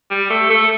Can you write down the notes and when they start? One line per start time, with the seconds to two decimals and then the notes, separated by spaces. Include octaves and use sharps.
0.11 G3
0.30 A3
0.50 A3